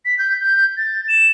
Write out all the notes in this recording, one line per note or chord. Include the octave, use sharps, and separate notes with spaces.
B6
G6
G6
A6
E7